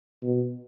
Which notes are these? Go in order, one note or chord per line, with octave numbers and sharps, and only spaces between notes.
B2